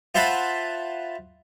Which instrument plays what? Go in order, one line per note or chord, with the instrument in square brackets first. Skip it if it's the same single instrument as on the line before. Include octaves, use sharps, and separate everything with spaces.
[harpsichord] F4 C5 E5 F#5 A5 B5